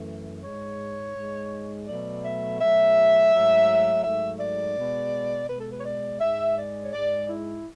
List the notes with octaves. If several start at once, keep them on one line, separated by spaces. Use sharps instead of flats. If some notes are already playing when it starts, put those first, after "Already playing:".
Already playing: F#2 E3 A3
G#2 G#3 C#5
G#2 G#3
B2 F#3 A3 D5
E5
B2 F#3 A3 E5
G#2 F#3 A3
G#2 F#3 A3 E5
E5
D5
B2 G#3
B2 G#3 B4
A4
B4
C#5
D5
G#2 G#3 E5
D5
C#5
G#2 G#3 D5
E4